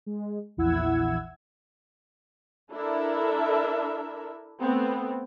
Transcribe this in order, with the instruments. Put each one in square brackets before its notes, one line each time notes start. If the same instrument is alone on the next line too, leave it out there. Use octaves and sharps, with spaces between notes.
[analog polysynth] G#3
A#1 E2 E4 F#5 E6 G#6
[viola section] D4 E4 A4 A#4 E5
A3 B3 C4